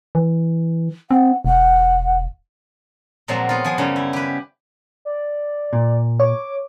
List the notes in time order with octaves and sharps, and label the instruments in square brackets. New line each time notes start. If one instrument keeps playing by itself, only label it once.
[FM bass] E3
[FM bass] C4 [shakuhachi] F#5
[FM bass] E1 [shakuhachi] F#5
[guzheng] A#2 F3 F#3 G#3 C4
B3 F4
F3 G#4
F#2 C#3 G3 C#4
E4
G4 B4
[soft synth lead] D5
[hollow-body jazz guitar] A#2
[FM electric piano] C#5 [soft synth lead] D6